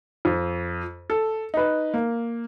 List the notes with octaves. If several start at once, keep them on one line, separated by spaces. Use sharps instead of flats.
F2
A4
D#4 B4
A#3